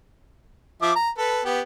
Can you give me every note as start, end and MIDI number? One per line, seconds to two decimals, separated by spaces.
0.82 0.92 53
0.82 0.92 76
0.82 0.92 86
0.96 1.10 82
1.18 1.42 69
1.18 1.42 71
1.45 1.61 59
1.45 1.61 67